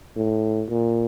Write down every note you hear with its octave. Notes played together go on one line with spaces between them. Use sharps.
A2
A#2